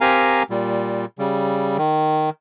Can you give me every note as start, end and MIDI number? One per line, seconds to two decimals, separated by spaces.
0.01 0.43 60
0.01 0.43 67
0.01 0.43 70
0.01 0.43 77
0.01 0.43 80
0.01 0.43 82
0.50 1.06 46
0.50 1.06 55
1.19 1.77 49
1.19 1.77 55
1.78 2.30 51